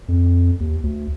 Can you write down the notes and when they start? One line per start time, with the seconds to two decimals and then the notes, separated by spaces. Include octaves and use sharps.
0.08 F2
0.60 D#2
0.83 D2